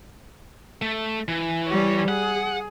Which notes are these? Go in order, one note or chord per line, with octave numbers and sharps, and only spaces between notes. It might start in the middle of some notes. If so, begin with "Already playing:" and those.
A3
E3
G3 C#5
G#4 F#5